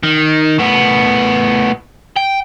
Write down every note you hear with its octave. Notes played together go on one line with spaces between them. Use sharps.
D#3
A2 B3
G5